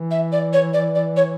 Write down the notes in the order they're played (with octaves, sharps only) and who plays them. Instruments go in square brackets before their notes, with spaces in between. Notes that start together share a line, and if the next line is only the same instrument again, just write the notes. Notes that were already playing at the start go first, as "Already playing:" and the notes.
Already playing: [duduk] E3
[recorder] E5
D5
C#5
D5
D5
C#5